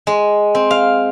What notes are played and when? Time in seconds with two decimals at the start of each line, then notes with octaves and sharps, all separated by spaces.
0.07 G#3
0.55 C4
0.71 F5